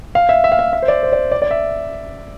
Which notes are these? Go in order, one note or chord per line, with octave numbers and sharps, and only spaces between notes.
F5
E5
E5
F5
E5
E5
C5
D5
C5
D5
D5
D5
E5